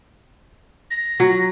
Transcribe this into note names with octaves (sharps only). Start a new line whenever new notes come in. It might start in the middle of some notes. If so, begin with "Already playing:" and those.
A#6
F#3